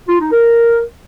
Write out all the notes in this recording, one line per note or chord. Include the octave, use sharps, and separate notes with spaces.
F4
D#4
A#4